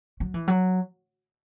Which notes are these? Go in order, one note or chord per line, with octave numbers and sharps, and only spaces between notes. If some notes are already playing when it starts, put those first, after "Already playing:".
F#3
E3
F#3